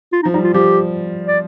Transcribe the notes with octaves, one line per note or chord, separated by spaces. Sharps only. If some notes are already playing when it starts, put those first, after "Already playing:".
F4
D#4
F3
G3 D#4
F4
F3 G4
D5